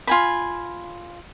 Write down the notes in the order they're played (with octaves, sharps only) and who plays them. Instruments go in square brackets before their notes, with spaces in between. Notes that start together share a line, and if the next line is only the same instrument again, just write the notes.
[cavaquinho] F4 G#5 B5